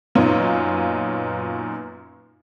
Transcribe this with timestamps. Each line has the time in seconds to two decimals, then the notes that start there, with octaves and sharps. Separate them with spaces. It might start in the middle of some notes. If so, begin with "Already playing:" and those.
0.15 F#2 A#2 B3 C#4 D#4 F4